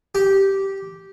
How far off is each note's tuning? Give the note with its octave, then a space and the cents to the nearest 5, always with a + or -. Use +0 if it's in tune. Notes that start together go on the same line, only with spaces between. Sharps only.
G4 -10